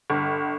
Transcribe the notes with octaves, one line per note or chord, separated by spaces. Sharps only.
G1